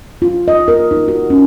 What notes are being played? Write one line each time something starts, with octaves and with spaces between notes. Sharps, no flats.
F4
D#5
A#4
D#4
F#4
C#4